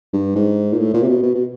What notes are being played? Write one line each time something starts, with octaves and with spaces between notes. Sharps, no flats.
G2
G#2
A#2
A2
A#2
C3
B2
B2
B2